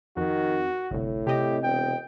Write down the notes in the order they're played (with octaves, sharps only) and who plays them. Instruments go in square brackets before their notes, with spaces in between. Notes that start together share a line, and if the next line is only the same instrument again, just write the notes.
[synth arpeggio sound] F2 [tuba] D#3 [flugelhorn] F#4
[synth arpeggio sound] G1 C2 [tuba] A2
[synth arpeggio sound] C3 D#5 [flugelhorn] G4
[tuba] E1 [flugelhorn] G5